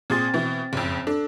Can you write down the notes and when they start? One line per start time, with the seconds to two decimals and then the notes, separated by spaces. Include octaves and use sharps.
0.10 A#2 C4 G#4 C6 A6
0.34 B2 E3
0.73 F#1 F2
1.07 D4 A4